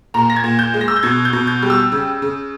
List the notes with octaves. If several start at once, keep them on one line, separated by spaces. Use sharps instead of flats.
A#2 A#5
A#6
G#6
A#2
G6
G#3
A#6
E6
G6
B2 G#6
G6
B2
G6
G3
E6
C#3
C#3